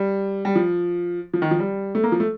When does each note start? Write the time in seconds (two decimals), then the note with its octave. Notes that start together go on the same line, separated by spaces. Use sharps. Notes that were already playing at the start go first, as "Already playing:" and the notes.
Already playing: G3
0.45 G3
0.55 F3
1.34 F3
1.42 D#3
1.51 F3
1.59 G3
1.95 A3
2.03 A#3
2.12 F3
2.20 A3